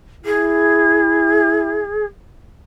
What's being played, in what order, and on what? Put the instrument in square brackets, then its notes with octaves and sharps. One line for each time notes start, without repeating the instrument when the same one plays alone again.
[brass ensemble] E4 [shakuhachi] G#4